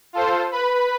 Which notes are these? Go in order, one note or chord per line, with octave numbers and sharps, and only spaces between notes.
F4 A4 C5
B4 B5